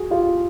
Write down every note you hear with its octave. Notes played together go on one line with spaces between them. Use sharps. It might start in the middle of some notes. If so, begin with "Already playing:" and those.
Already playing: F#4 G#4
F4 G4